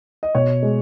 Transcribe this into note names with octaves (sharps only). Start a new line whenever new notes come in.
D#5
B2 C#5
G#3